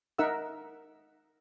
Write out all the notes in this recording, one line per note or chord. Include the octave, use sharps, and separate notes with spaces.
D#4 A#4 E5 F#5 E6